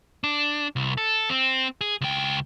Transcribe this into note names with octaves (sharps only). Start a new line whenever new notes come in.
D4
C2
A4
C4
G#4
C#2 G5